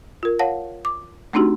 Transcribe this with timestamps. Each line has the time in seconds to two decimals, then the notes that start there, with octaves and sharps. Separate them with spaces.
0.23 F4 A#4
0.39 C#5 F5 F#5 A5 A#6
0.85 D6
1.33 A3 C4 D4 D#4 F#4 G4